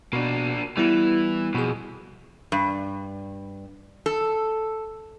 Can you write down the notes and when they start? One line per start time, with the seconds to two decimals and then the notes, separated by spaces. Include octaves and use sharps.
0.13 B2 A#3 D4
0.77 E3 G3 B3 E4
1.54 F2 B2 G#4
2.52 G2
4.06 A4